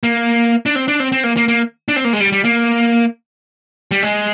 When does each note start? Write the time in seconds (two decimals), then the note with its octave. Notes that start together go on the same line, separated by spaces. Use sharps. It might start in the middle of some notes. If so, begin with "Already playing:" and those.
0.03 A#3
0.66 D4
0.76 C4
0.88 D4
1.00 C4
1.12 C4
1.24 A#3
1.37 A#3
1.48 A#3
1.89 D4
1.96 C4
2.05 A#3
2.13 G#3
2.20 G3
2.32 G3
2.44 A#3
3.91 G3
4.02 G#3